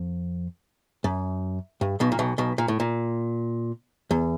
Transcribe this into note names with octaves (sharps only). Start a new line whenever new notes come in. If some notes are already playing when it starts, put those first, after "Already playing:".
Already playing: F2
F#2
G2
B1 B2
A#2
B1 B2
B1 B2
A#2
A2
A#2
E2